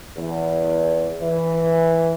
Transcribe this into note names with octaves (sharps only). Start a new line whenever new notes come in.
E2
E3